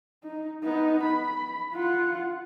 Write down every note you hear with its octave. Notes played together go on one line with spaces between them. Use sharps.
D#4
B3 D#4
B5
F4 F#5